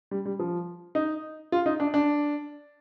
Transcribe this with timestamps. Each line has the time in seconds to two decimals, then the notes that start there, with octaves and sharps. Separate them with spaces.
0.11 G3
0.26 G3
0.40 F3
0.95 D#4
1.52 F4
1.66 D#4
1.80 D4
1.94 D4